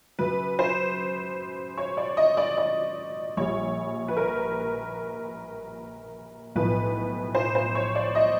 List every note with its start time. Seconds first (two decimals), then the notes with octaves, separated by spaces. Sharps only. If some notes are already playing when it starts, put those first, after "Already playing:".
0.19 F#2 C#3 F#3 B4
0.59 C5
1.77 C#5
1.97 D5
2.17 D#5
2.37 D5
2.57 D5
3.37 A#1 A#2 G3 C#5
4.08 B4
4.17 A#4
6.55 B1 A2 F3 B4
7.35 C5
7.55 C5
7.75 C#5
7.95 D5
8.15 D#5